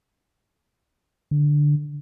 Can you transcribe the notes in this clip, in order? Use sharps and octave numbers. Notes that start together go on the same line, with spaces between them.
D3